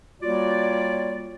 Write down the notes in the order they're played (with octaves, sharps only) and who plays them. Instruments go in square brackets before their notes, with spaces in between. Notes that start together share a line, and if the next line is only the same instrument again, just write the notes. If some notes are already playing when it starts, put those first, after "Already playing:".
[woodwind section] G3 A#3 F4 F#4 C#5 D5